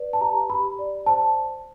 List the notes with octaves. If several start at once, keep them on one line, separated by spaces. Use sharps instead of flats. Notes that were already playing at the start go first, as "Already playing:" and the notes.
Already playing: B4 D5
A5
G4 A#5
G4 B5
D5
C5 A5